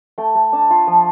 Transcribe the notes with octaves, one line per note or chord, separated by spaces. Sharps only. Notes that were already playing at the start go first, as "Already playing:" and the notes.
A3 G5
A3
D4 A5
F4
F3